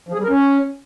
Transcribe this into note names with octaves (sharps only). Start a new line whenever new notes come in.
F3
G#4
G3
A#4
C#4